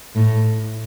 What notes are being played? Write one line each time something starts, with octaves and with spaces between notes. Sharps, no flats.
A2